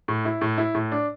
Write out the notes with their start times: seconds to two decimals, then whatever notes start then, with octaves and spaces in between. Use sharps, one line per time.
0.08 A2
0.25 E4
0.41 A2
0.58 E4
0.75 A2
0.92 D4